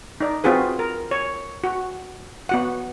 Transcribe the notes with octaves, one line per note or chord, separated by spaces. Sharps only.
D#4 D5
C4 F4 F#4 G#4 B4
A#4
C#5
F#4
B3 F#4 F#5